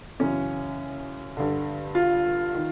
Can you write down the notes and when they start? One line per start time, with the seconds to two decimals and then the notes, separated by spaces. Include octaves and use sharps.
0.19 F#2 C#3 E3 C#4
1.37 G2 D3
1.95 F4
2.54 D#3